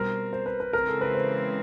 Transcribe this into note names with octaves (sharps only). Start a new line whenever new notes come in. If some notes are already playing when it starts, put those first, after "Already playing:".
Already playing: B2 G3 C4 A#4
C5
B4
B4
C#3 E3 G#3 C4 A#4
A4
B4
C5